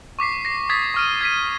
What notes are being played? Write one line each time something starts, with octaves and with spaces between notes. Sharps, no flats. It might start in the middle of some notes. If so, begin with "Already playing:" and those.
C#6 D6 B6 C7
A#6 C7
D6 D#6 G#6 A6 B6
C#6 F6 D#7
G#6 B6 D#7